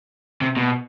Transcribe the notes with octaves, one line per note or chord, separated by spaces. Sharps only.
C3
B2